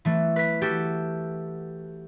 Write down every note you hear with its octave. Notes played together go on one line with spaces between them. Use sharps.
E3 A3
B4 B6
F#4 G4 A4